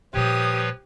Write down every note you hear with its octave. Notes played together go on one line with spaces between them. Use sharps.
A#2 F3 G3 G4 B4 C#5 D#6